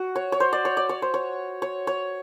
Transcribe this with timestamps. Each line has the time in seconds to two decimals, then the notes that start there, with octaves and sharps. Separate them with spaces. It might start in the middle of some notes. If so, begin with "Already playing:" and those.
Already playing: F#4
0.16 C#5
0.32 C#5
0.40 C5
0.53 D5
0.65 C#5
0.77 D5
0.89 C#5
1.02 C5
1.14 C#5
1.62 C#5
1.87 C#5